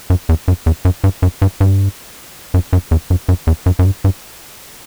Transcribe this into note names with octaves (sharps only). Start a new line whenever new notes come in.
F#2
E2
F#2
E2
F#2
G2
F#2
G2
G2
F#2
F#2
E2
F#2
F#2
E2
F#2
F#2
G2
G2